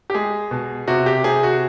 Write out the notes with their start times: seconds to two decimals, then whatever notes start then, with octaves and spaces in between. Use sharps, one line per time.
0.10 G4
0.15 G#3 G#4
0.51 B2
0.88 C3 F#4
1.06 G4
1.24 C3 G#4
1.43 F#4